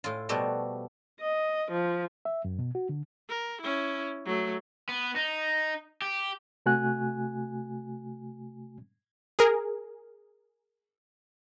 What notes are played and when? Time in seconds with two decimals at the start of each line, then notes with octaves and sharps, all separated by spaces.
0.04 A2 F4
0.29 B2 F3 G3 A3 F#4
1.21 D#5
1.71 F3
2.25 E5
2.45 F#2
2.59 B2
2.75 F#4
2.89 D3
3.29 A#4
3.62 C#4 E4
4.25 F#3 A3
4.89 B3
5.16 D#4
6.02 G4
6.66 C3 A3 F#4 G#5 F#6
9.39 G#4 A#4